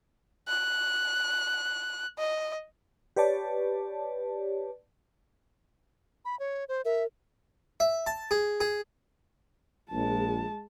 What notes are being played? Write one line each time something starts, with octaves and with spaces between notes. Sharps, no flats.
F#6
D#5
G4 B4 C#5 D5 A5
B5
C#5
C5
A#4 E5
E5
A5
G#4
G#4
A#1 G#3 A5